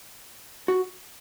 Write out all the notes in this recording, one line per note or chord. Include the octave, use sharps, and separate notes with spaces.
F#4